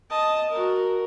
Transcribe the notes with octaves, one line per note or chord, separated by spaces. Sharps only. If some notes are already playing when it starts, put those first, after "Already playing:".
D#5 A5
F#4 A#4